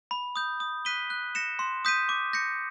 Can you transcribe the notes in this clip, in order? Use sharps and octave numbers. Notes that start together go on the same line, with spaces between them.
B5
D#6 G6
D#6
F#6 B6 D#7 G7
F#6
A#6 C#7 E7
C6
D#6 G6 B6 D#7
D6
G6 A#6 C#7